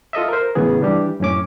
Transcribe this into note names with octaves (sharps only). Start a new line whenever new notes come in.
F4 A4 D#5 E5
A#4 C5
A2 C#3 E3 B3 G#4
E3 G3 D4 G4
F#2 A2 C#4 D6